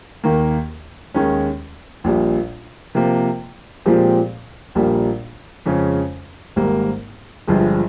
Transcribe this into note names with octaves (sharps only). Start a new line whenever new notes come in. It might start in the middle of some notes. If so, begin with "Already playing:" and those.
D#2 D#3 A#3
D#2 D#3 G#3 C#4
A#1 A#2 G3
C3 F3 A#3 F4
A#2 F3 G#3 C4 G4
A#1 A#2 G3 A#3
F2 C#3 G#3 C#4
G#1 G#2 G3 A#3
G1 G2 F3 G#3